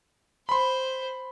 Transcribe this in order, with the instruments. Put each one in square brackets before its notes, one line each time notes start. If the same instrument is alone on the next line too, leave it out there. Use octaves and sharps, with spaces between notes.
[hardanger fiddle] C5 [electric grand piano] B5 C6